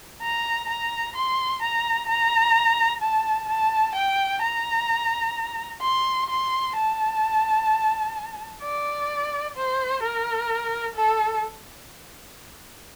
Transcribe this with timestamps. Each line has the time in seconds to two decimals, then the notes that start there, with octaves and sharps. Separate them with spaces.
0.22 A#5
0.69 A#5
1.16 C6
1.62 A#5
2.08 A#5
3.02 A5
3.49 A5
3.95 G5
4.42 A#5
5.82 C6
6.29 C6
6.76 A5
8.62 D5
9.56 C5
10.02 A#4
10.95 A4